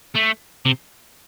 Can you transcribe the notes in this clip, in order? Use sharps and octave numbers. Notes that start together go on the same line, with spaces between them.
A3
C3